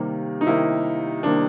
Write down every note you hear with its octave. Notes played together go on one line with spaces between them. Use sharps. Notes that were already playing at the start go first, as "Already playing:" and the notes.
Already playing: C3 D#3 G3 A#3
D#4
C3 D#3 G3 A#3 E4
C3 D#3 G3 A#3 D4